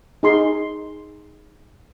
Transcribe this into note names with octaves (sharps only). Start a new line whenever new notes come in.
D#4 G#4 C6